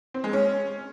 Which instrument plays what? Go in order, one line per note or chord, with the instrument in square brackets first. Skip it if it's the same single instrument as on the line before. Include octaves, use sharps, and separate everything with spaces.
[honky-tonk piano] C4
G#3
C#4